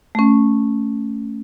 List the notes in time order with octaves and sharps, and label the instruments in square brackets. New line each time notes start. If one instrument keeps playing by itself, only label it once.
[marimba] A3 C#4